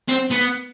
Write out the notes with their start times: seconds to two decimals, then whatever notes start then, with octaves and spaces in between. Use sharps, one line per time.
0.08 C4
0.31 B3